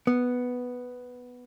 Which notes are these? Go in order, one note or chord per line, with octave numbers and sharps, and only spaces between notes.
B3